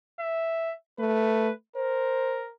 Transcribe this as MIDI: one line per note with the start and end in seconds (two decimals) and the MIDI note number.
0.20 0.73 76
0.99 1.50 57
0.99 1.52 71
1.76 2.53 70
1.76 2.44 72